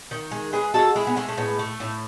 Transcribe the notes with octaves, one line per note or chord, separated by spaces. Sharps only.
D#3
G#3
G#3 G#4 B4
G#3 F#4 A4
G#3 E4 G#4
B3
G#3 A3
A3
A2 B3
A3
A2